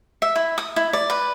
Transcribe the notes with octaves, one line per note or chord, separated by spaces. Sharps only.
E5
E4
D#6
E4
D5
B4